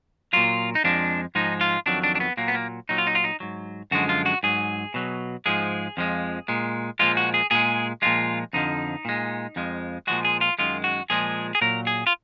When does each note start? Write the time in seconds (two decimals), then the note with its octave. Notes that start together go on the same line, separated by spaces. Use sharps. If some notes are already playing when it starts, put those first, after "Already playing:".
0.33 A#2 F#3 F4
0.75 D#4
0.84 F2 F3 G#3 D4
1.35 G#2 F3 G#3 D#4
1.61 F4
1.86 F2 D#3 F#3 D4
2.04 D4
2.15 D4
2.20 B3
2.37 A#2 F#3 A#3
2.48 B3
2.55 A#3
2.89 A#2 F#3 D#4
2.98 F4
3.07 D#4
3.15 F4
3.24 D#4
3.40 G#2 F#3
3.91 F#2 D3 F3 G#3 F#4
4.09 F4
4.26 F#4
4.43 G#2 F#3 G#4
4.94 B2 F#3
5.46 G#2 F3 G#3 G#4
5.97 F2 F3 G#3
6.48 A#2 G#3
6.99 A#2 F3 G#3 F4
7.17 F#4
7.34 G#4
7.51 A#2 G#3 G#4
8.02 A#2 F3 G#3 F4
8.53 F2 D3 F3 D#4
9.05 A#2 G#3
9.56 F2 F3 G#3
10.07 A#2 F3 G#3 F#4
10.25 G#4
10.41 F4
10.59 F#2 D#3 G#3 F4
10.84 F#4
11.10 A#2 F3 G#3 G#4
11.55 G#4
11.61 A#2 F#3 A#4
11.87 G#4
12.07 F4